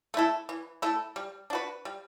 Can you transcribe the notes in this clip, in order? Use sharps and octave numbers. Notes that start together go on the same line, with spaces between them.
A3 E4 A4
E3
A3 E4 A4
G3
D4 F#4 B4
G3